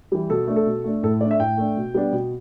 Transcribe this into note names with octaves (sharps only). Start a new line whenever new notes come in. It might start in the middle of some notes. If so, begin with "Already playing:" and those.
E3 G3
B2 A4
A3 D4
A4
B2
A3 D4
A2 A4
A3 D4 D5
E5
A2 G5
A3 D4
B2
G3 B3 D4
B2